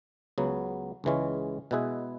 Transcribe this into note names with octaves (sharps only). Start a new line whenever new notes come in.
C#2 C#3 F#3 B3
C#2 C#3 E3 G#3 C#4
B2 G#3 E4 G#4 B4